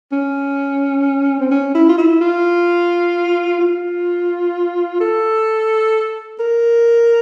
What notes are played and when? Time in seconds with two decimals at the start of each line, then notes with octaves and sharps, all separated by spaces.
0.12 C#4
1.40 C4
1.51 C#4
1.75 E4
1.89 F4
1.98 E4
2.21 F4
3.60 F4
5.00 A4
6.39 A#4